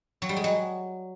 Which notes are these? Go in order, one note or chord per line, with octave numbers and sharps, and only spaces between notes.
F#3
G3
G#3
F#3